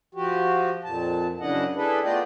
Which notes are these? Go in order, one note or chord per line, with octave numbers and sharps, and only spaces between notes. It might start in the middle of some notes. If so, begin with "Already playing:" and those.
F3 F#4 G4
F2 A#2 A5
F#2 C#3 D4 E4 D#5 F#5
D4 E4 G#4 A4 B4
A3 B3 F4 D5 D#5 G5